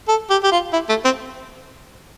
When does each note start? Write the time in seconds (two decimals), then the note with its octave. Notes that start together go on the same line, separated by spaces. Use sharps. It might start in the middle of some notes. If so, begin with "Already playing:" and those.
0.08 A4
0.30 G4
0.44 G4
0.52 F4
0.73 E4
0.89 A3
1.05 C4